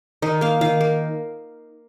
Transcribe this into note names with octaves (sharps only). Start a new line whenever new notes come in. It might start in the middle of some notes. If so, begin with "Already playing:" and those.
D#3 D#4
A#3 F5
D#3 F5
A#3